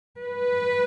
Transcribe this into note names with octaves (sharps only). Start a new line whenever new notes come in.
B4